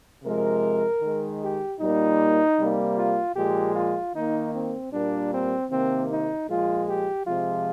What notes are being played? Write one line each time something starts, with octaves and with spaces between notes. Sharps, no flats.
C3 F3 G#3 A#4
D#3 G#3
G4
A#2 G3 A#3 D#4
C3 G3 A#3
F4
A#2 F3 G#3 G4
F4
D#3 A#3 D#4
C4
A#2 G3 A#3 D4
C4
C3 D#3 A#3 C4
D#4
A#2 F3 G#3 F4
G4
C3 F3 G#3 F4